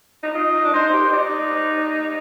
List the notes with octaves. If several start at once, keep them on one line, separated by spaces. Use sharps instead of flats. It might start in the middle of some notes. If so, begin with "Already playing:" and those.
D#4
F4 D#5
D#4
D4
D#4 C5
G4
D#4 D5